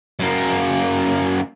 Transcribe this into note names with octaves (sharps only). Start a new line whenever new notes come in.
F#2 A#3